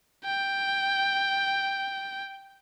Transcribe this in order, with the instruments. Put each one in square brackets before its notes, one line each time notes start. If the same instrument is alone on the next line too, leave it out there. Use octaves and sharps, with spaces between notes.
[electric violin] G5